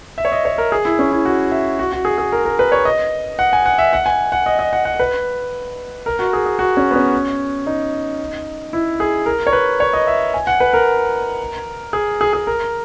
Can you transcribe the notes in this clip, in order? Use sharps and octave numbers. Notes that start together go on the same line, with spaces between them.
E5
C#5
D#5
C#5
A#4
G#4
E4
C#4
E4
F#4
E5
F#4
F#4
G#4
G#4
A#4
A#4
B4
C#5
D#5
F#5
G#5
F#5
E5
F#5
G#5
F#5
D#5
D#5
F#5
F#5
B4
A#4
F#4
G#4
G#4
F#4
C#4
B3
C#4
D#4
E4
G#4
A#4
C#5
B4
C#5
D#5
E5
G#5
F#5
B4
A#4
G#4
G#4
G#4
A#4